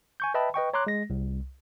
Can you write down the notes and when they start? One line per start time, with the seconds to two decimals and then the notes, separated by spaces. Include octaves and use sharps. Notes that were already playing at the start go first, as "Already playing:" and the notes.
0.20 G#5 C#6 G6
0.34 B4 D#5 E5 G5 A5 B5
0.54 B4 D#5 G5 C#6
0.74 C#5 A#5 C6 D6 F#6
0.87 G#3 A#6
1.10 C2